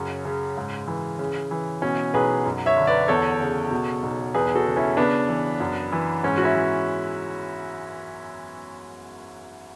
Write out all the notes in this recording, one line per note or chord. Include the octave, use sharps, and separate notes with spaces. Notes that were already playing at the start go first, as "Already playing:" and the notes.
Already playing: F#2 C#3 C#4
C#3
G#2
E3
C#3
E3
B2 C#4
B1 G#4 B4
F#2
C#5 E5
D3
B4 D5
E2 A4 C#5
C#3
B2
B1
E2 G#4 B4
F#4 A4
C#3
C#4 E4
C#3 B3 D4
E3
F#2
E3
G#2 C#4
F#4
C#4 E4
E3